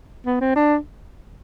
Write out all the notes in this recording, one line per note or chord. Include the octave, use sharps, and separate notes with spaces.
B3
C4
D4